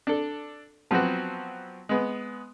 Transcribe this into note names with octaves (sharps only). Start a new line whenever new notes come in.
D4 A4
F3 F#3 B3 C4 F#4
G#3 B3